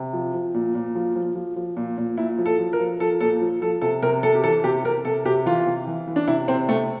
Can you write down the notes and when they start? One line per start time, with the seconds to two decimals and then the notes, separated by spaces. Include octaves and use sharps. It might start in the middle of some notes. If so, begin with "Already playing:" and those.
Already playing: C3
0.13 F3
0.34 F3
0.54 A#2
0.75 A#2
0.95 F3
1.16 F3
1.35 F3
1.56 F3
1.77 A#2
1.98 A#2
2.18 A#2 E4
2.38 F3
2.46 A4
2.59 F3
2.73 A#4
2.80 F3
3.00 F3 A4
3.21 A#2 A4
3.41 F3
3.62 F3 A4
3.82 C3 A4
4.03 C3 A#4
4.23 C3 A4
4.35 G4
4.43 E3 A4
4.64 C3 G4
4.84 C3 A#4
5.05 C3 A4
5.25 C3 G4
5.46 E3 F4
5.67 C3
5.87 E3
6.07 E3
6.16 D4
6.28 C3 E4
6.48 C3 C4
6.69 C3 A3